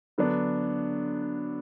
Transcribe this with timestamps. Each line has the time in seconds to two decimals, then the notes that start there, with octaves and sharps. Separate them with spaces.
0.18 D3 F#3 B3 D4